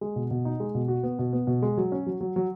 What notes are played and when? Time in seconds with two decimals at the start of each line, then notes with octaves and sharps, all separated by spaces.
0.01 G#3
0.16 B2
0.31 B2
0.45 D#4
0.60 G#3
0.75 B2
0.88 F#4
1.03 B3
1.19 B2
1.33 B3
1.47 B2
1.62 G#3
1.77 F#3
1.92 C#4
2.06 F#3
2.21 F#3
2.36 F#3